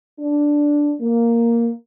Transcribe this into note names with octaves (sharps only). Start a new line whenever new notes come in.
D4
A#3